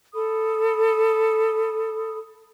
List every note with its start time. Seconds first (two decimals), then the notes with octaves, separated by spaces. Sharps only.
0.14 A4 B5 D#6